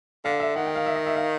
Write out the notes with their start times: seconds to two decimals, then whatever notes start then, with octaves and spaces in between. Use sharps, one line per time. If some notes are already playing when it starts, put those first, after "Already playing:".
0.25 D3 F5
0.40 E5
0.56 D#3 F#5
0.66 G5
0.75 F5
0.86 E5
0.96 D#5
1.06 E5
1.16 F5